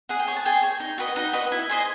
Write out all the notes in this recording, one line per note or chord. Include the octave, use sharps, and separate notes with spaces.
G#4 F#5
G5
C#5 G#5
A5
G#4 G5
C#5
D#4
F#4 B4 D#5
D#4 F#5
F#4 B4 D#5
E4
G#4 C5 D#5